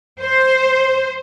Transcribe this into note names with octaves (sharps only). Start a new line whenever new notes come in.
C5